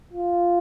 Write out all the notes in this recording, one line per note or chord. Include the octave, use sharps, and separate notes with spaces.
F4